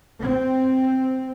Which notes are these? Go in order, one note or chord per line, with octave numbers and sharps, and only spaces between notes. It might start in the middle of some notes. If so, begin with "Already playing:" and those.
C4